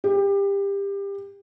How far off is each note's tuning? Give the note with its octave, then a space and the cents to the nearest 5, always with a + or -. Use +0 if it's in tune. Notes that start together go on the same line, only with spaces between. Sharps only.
G4 +25